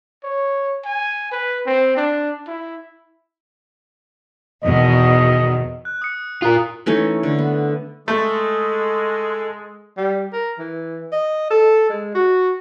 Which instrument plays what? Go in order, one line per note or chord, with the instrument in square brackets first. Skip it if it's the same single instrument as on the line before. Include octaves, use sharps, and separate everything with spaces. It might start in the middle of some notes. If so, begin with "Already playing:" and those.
[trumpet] C#5
G#5
B4
C4
D4
E4
[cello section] E2 B2 D#3 [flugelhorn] D#5
[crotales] F#6
D#6 F#6 C#7
[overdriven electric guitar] F4 A#4 [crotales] D#6 F#6
[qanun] E3 A3 C#4 D#4
D3
B3
[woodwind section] G#3 [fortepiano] A3 [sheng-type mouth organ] A4
[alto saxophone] G3
A#4
E3
D#5
A4
G#3
F#4